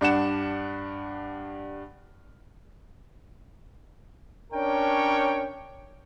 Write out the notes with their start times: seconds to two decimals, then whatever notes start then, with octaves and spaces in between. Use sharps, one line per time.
0.01 G2 D4 F#5 E7
4.53 C#4 D4 A#4 C#5 G5